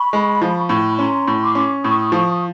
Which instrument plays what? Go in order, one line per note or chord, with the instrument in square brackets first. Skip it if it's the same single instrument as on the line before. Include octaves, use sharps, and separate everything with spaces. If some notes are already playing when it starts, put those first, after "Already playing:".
Already playing: [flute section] B5 C#6
[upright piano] G#3
F3
A2
[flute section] B5
[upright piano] C#4 [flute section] A#5 C6
[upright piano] A2
[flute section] C6 D6
[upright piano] C#4
[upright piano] A2 [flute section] C#6 D#6
[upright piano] F3